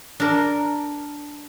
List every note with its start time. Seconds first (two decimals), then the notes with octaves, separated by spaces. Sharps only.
0.20 D4 A#4